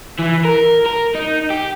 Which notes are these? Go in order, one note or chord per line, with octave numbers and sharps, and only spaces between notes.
E3
A#4
A#4
D#4
G4